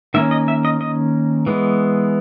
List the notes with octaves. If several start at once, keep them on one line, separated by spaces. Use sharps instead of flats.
D#3 A#3 C#4 E5
D#5
E5
D#5
D#5
E3 G#3 B3